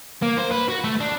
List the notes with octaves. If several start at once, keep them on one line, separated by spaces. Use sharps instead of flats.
A#3
C5
B4
F#4
A3
D4